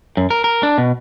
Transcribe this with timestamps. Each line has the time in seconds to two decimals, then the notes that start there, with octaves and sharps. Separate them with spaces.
0.17 F#2
0.31 A#4
0.44 A#4
0.63 D4
0.78 B2